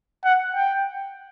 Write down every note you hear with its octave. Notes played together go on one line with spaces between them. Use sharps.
F#5
G5